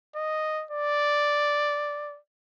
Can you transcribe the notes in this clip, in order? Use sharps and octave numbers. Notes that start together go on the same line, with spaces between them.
D#5
D5